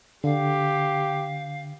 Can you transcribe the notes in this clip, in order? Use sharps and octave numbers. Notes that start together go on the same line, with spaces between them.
D3 G4 F5